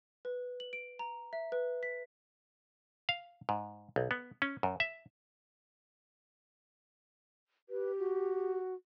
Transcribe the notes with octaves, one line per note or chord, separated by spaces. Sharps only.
B4
F#7
D7
A#5
E5
B4
B6
F5
G#2
B1
B3
C#4
F#2
E5
G4 B4
F#4